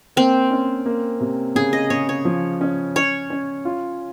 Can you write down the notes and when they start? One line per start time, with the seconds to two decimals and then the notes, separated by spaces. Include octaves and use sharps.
0.16 A#3 C4
0.51 C#4
0.86 A#3
1.20 C3
1.55 C#3 G#4
1.73 D#5
1.90 C#3 C#5
2.09 C#5
2.25 F3
2.61 C#4
2.96 C#4 C#5
3.30 C#4
3.65 F4